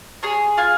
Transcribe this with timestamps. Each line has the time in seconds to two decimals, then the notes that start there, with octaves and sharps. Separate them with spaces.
0.23 G#4 C#5
0.58 F4 G#5